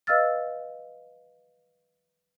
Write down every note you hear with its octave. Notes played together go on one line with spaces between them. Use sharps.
B4 D#5 F5 E6 F6 A6